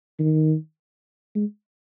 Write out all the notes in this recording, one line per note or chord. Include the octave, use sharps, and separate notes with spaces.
D#3
G#3